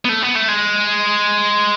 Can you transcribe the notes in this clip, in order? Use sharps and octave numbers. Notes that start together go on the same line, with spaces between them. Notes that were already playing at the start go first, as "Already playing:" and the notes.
B3
A3
B3
A3
G#3